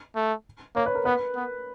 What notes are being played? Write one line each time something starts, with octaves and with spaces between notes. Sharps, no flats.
A3
A#3 C#5
B4
A#4
B3 B4
B3